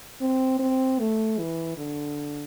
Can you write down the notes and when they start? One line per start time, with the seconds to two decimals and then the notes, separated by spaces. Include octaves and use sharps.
0.21 C4
0.59 C4
0.99 A3
1.39 E3
1.77 D3